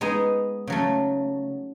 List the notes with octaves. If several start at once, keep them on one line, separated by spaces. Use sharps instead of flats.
G#3 B3 D#4 G#4
C#3 F#3 A3